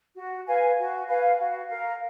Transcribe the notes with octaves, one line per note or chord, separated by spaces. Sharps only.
F#4
B4 F5 G#5
F#4
B4 F5 G#5
F#4
A#4 F5